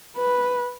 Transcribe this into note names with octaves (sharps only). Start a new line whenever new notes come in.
B4